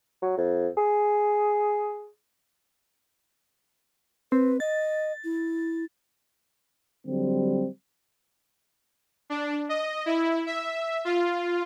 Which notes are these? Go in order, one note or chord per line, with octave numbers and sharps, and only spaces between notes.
F#3
F2
G#4
C4 B4
D#5 A6
E4
D3 F#3 G3 C4
D4
D#5
E4
E5
F4